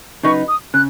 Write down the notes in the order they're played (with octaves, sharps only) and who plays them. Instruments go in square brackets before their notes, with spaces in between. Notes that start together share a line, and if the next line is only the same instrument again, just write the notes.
[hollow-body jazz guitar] C#3 F#3 D#4 B4 [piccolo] C#6
[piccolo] D#6
[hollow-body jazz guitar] C#3 [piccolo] F#6